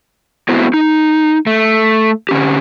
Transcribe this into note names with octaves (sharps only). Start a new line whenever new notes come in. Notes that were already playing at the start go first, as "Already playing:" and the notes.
A3 B3 C4 E4 F#4
D#4
A3
D3 C#4 G4